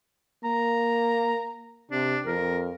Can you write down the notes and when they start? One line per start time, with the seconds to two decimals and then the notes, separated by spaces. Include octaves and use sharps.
0.44 A#3 A#5
1.91 C3 D4
2.26 F2 A#4